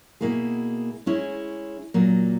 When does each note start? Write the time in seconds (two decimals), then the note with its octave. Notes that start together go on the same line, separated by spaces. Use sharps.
0.21 B2 A#3 E4 G#4
1.06 G#3 C#4 E4 G#4
1.94 A#2 F#3 A#3